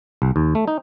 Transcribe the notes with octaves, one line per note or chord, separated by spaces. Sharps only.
C2
D#2
A3
D#4